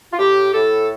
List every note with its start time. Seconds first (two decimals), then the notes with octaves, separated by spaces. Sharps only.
0.13 F4
0.19 A2 G4
0.54 A2 A4